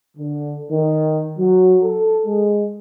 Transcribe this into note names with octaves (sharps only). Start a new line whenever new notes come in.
D3
D#3
F#3
A4
G#3